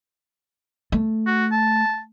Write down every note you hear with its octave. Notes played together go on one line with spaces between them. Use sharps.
A3
F#4
A5